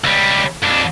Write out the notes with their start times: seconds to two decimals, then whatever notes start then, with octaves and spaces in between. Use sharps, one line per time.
0.04 C#2 G3
0.62 F2 D4